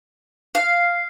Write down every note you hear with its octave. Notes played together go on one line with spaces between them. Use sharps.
F5